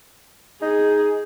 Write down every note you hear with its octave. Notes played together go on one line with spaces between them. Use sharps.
D#4 G#4